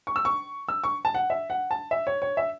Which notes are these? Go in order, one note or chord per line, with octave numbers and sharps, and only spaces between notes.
C#6
E6
C#6
E6
C#6
A5
F#5
E5
F#5
A5
E5
C#5
C#5
E5